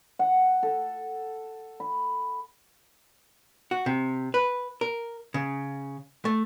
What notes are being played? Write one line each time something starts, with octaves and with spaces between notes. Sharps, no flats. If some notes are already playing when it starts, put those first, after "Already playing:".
F#5
A4
B5
F#4
C3
B4
A#4
C#3
A3